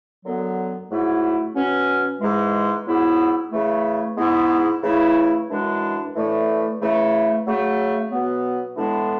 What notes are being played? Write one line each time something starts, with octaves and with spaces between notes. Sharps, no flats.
F#2 D3 F#3 B3
G#2 F#3 A3 E4
B2 F#3 C#4
G#2 E3 G#3
G#2 F#3 B3 E4
C#3 E3 A3
G#2 G#3 B3 E4
C#3 E3 A3 E4
F#2 E3 G#3 D4
A2 E3 A3 D4
C#3 E3 A3
C#3 F#3 A3
B2 F#3 B3
A2 E3 G#3 B3 D4